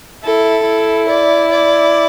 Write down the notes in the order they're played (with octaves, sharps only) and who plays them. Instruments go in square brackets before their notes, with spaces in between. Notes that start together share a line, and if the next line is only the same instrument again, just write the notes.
[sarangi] E4 [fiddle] A4
[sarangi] E4
[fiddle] D5
D5